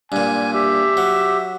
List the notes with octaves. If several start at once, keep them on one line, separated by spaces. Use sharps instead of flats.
G2 A#2 G#5
G4 E5
F#3